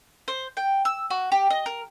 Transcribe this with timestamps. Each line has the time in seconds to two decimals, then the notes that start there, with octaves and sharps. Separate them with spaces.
0.28 C5
0.57 G5
0.85 E6
1.11 F#4
1.32 G4
1.50 D#5
1.66 A#4